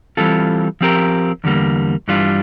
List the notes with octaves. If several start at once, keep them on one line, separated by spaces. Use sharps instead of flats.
E3 G3 C4 F4 A4
F3 C4 G4 A#4
E2 D3 G3 A#3
G2 E3 G3 D4 F4